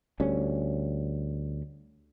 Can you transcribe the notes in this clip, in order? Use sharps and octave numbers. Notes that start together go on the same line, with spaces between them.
D2 G3 C#4